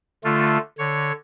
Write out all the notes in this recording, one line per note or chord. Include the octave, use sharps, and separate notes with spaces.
D3 A3 F4
D3 C#5